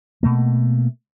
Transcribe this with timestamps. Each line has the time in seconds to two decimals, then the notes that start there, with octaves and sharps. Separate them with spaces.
0.23 B2 A3 A#3